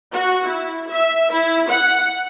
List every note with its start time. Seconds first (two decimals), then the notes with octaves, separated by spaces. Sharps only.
0.13 F#4
0.47 E4
0.90 E5
1.31 E4
1.69 F#5